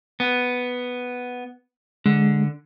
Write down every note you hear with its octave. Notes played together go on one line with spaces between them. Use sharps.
B3
D3 G#3